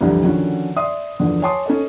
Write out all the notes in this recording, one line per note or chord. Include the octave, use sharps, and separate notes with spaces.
C2 F2 D3 E3 G3
D3 D#3 F3 C#4 F#4
D5 E5 C6 D#6
E2 D3 F3
C#5 G#5 A5 C6 D6 D#6
C#4 A4 D#5